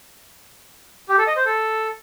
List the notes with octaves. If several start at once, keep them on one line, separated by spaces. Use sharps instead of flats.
G4
A4
D#5
C5
A4